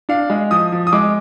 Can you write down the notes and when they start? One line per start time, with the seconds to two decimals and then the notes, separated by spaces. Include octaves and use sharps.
0.09 D4 F5
0.30 G#3
0.51 F3 D#6
0.72 F3
0.87 D#6
0.93 G#3 D6